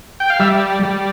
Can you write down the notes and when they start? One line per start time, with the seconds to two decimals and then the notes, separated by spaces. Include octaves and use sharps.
0.20 G5
0.30 F5
0.40 G3 E5
0.83 G3